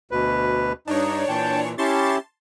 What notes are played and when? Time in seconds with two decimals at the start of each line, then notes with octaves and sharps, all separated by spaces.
0.11 D2 B2 B4
0.88 G2 D4 D#4 C#5
1.28 A#2 E3 G5 A5
1.78 C#4 E4 G4 A5 C6 C#6 A6